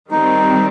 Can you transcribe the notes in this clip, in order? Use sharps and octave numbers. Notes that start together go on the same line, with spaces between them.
D#3 G3 C4 D#4